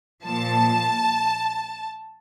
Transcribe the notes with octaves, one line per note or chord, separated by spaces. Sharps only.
A#2 F3 A5